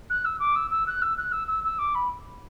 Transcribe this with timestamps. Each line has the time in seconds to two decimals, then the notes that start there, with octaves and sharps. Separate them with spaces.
0.10 F#6
0.25 E6
0.39 D6
0.55 E6
0.70 E6
0.87 F#6
1.02 E6
1.17 F#6
1.32 E6
1.47 E6
1.64 E6
1.78 D6
1.94 B5